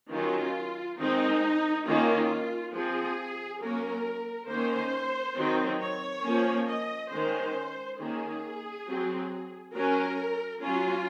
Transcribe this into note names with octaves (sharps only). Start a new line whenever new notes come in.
D#3 F#3 C#4 F4
D#3 G#3 C4 D#4
D#3 A#3 C#4 F4
F3 C4 G#4
F#3 A#3 C#4 A#4
D#3 A#3 C#4 C5
D#3 F#3 C4
C#5
F3 A#3 C#4
D#5
D#3 G#3 C#4 C5
D#3 A#3 C#4 G#4
F#3 C4
F#3 C#4 A#4
F#3 C#4 F4